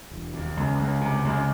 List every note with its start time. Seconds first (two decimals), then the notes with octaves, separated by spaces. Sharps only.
0.11 E1
0.34 D#2
0.57 C#2
0.79 C#2
1.01 C3
1.24 C#2